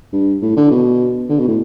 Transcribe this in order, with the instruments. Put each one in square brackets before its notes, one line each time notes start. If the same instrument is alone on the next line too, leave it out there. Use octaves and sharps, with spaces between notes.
[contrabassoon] G2
A2
D3
B2
D3
B2
A2